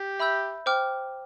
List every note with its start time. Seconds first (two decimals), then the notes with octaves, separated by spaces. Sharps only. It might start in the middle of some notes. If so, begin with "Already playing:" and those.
Already playing: G4
0.20 E5 B5 E6 G6
0.66 C5 G5 D6 F6